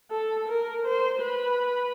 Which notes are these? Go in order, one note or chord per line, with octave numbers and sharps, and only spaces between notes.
A4
A#4
C5
B4